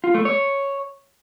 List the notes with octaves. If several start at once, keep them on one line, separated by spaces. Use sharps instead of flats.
F4
A3
C#5